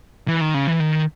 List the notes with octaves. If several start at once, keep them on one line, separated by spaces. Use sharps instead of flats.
E3
D#3
C#3
E3
D#3